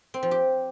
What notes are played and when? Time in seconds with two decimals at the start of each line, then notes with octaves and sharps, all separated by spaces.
0.14 C4
0.23 F3
0.31 G4